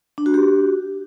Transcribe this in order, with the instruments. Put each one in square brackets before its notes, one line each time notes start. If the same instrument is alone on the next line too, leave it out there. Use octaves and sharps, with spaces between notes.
[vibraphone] D4
F#4
G4